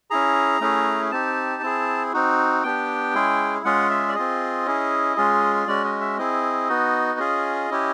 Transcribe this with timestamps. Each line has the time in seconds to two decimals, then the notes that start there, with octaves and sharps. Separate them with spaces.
0.10 C#4 E4 G#4 A#5
0.61 A3 C#4 E4 G#4
1.12 C4 D#4 G4 A5
1.63 C4 E4 G#4
2.13 C4 D#4 F#4
2.63 B3 D4 G4 G5
3.14 G#3 C#4 E4 G#4
3.65 G#3 C#4 F4 G#4 F#5
3.90 E5
4.08 D5
4.15 C4 F4 G#4 D#5
4.66 C#4 E4 G#4
5.16 G#3 C#4 F4 G#4
5.67 G#3 C#4 F#4 D5
5.84 D#5
6.01 E5
6.18 C4 E4 G#4 D#5
6.69 B3 D#4 F#4
7.19 C#4 F4 G#4
7.71 C#4 E4 G4